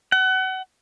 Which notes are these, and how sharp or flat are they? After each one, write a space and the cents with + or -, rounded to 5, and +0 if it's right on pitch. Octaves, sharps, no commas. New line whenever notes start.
F#5 +30